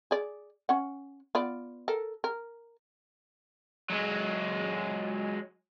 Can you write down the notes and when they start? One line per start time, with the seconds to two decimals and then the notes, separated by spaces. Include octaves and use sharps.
0.11 G#4 D5
0.69 C#4 F#5
1.35 B3 F4 D5
1.88 A4 A#4
2.24 A#4
3.90 F#3 G#3